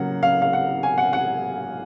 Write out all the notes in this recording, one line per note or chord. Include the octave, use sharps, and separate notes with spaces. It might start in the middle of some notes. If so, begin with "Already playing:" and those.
Already playing: C#3 F#3 A#3 F#5
F5
F5
F#5
G#5
F#5
F#5